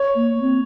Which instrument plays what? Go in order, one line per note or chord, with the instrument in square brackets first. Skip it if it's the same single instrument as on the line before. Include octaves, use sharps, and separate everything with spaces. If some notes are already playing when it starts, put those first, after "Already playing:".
Already playing: [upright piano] C#5
[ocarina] A#3
C4